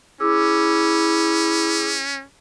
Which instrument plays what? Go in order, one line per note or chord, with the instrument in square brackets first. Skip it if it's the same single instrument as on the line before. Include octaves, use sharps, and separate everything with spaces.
[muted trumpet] C#4 [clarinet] E4 [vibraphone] G#4 D6 E6